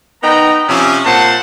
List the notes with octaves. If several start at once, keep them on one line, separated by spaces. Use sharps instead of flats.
B3 D#4 G5 A#5
C3 F3 G3 C#4
A#2 C5 F#5 A5